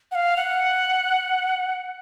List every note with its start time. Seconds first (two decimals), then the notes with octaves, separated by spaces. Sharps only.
0.11 F#5
0.15 F5
0.37 F#5